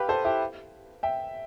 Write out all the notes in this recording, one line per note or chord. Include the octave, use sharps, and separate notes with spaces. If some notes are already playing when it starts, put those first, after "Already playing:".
Already playing: G4 B4 F5
A4 C5
E4 G4
E5 G5